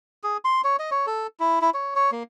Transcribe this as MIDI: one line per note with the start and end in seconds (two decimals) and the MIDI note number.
0.24 0.37 68
0.45 0.61 84
0.64 0.76 73
0.79 0.90 75
0.91 1.06 73
1.07 1.27 69
1.40 1.59 64
1.61 1.70 64
1.74 1.94 73
1.95 2.11 73
2.12 2.23 58